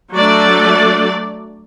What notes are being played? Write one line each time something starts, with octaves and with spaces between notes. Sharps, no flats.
F#3 A3 D4 D5